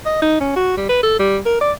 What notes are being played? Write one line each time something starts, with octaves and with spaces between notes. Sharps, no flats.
D#5
D#4
C#4
F#4
G3
B4
A4
G3
A#4
D5